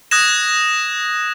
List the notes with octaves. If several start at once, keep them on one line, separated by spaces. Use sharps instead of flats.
D#6 F#6 G#6 A#6 E7